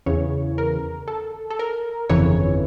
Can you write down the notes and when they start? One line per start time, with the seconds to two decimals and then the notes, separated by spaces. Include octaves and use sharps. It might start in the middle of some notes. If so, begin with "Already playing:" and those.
0.06 E2 C#3 E3 C#5
0.58 A#4
1.08 A4
1.50 A4
1.59 A#4
2.09 G1 F2 C#3 E3 C#5